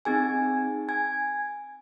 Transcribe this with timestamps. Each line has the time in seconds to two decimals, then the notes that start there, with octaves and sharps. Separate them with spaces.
0.05 C4 D#4 G#4 G#5 G#6
0.89 G#5 G#6